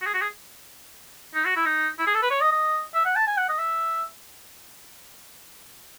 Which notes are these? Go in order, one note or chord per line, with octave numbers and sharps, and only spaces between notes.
F#4
G#4
F#4
G#4
D#4
F#4
E4
D#4
E4
G#4
A4
B4
C#5
D#5
D#5
E5
F#5
A5
G#5
F#5
D#5
E5